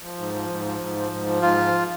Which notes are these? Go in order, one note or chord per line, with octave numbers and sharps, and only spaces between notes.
F3
G#2
F3
G#2
F3
G#2
F3
G#2
F3
G#2 F4
F3